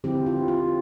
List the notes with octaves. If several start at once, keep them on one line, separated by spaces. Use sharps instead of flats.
D3 F3 C4 E4 G4
F4
F4